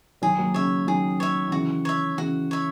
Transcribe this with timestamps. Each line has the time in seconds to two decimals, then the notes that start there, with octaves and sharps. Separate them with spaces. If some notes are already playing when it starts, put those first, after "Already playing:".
0.22 D#3 F#3 G#4
0.38 F#3 A#3
0.54 C#3 C#5 E5
0.87 D#3 F#3 G#4
1.20 C#5 E5
1.48 D#3
1.52 C#3 E3 F#4
1.85 C#5 E5
2.18 C#3 E3 F#4
2.51 C#5 E5